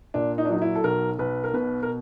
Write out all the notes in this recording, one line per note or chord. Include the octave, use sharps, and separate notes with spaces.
A#2 D4
D#4
D4
F#3 D#4
E4
A4
B1 A#4
B1 B4
A#4
B2 B4
A#4